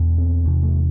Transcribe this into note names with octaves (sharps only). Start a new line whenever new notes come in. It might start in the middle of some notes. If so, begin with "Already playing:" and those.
Already playing: E2 B2
C4
E2 C3
A3